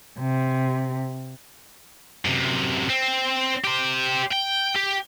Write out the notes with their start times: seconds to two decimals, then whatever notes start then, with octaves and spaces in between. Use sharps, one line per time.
0.19 C3
2.25 F#2 C3
2.90 C4
3.64 G4 C5
4.31 G5
4.75 G4